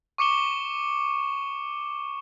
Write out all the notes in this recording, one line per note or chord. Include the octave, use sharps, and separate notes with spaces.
C#6 D6 C#7 E7 G7